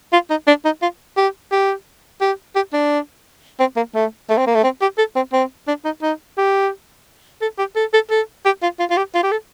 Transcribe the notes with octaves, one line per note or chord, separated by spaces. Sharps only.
F4
D#4
D4
D#4
F4
G4
G4
G4
G4
D4
C4
A#3
A3
A3
C4
A#3
A3
C4
G4
A4
C4
C4
D4
D#4
D#4
G4
A4
G4
A4
A4
A4
G4
F4
F4
F4
G4
F4
G4
A4